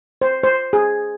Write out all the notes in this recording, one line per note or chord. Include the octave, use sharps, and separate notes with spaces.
C5
C5
G#4